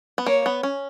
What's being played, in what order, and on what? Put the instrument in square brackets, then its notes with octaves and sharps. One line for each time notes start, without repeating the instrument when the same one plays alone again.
[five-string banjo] B3
[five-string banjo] A#3 [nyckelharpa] C#5
[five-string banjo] B3
C#4